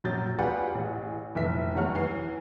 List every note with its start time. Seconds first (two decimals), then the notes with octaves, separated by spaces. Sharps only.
0.04 A#1 F#2 A#2 F#3 G6 A6
0.39 F4 G4 G#4 B4 D5 F#5
0.75 A1 G#4
1.35 F1 A#1 E3 E5 B6
1.75 F#1 E2 G3 C#5 F#5 F6
1.95 E3 C7